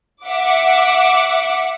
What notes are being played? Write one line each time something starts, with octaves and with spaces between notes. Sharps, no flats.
E5 F#5 D6